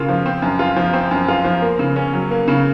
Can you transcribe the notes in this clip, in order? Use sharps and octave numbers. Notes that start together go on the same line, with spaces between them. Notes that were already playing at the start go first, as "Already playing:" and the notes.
Already playing: C#3 A#3 F4
F3
C4
F#2
F4
F3
C4
F#2
F4
F3
A#3
C#3
C#4
F#3
A#3
C#3